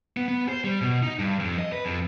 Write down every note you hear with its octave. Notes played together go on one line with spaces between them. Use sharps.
B3
B3
C5
G3
B2
D#4
G2
F2
D#5
B4
F2